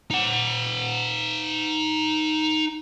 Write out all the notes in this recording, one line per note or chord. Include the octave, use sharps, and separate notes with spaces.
D#4 F#5